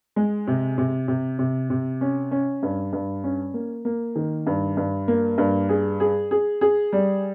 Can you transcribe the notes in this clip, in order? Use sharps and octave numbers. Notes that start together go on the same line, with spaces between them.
G#3
C3
C3
C3
C3
C3
C#4
C#4
G2
G2
C#4
A#3
A#3
D#3
G2
G2
A#3
G2
G#4
G#4
G#4
G#4
G3